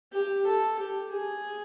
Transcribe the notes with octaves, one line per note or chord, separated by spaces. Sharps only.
G4
A4
G4
G#4